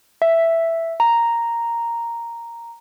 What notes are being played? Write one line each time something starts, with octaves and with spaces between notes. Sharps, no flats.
E5
A#5